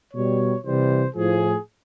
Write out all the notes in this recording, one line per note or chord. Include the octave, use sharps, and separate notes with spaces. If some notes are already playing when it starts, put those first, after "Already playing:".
B2 G3 C#5
C3 E3 G3 C5
A2 F3 G#4